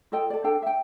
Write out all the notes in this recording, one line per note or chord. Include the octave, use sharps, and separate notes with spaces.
F4 A4 D#5 G5
A4 D5
D4 A4 G5
E5 G5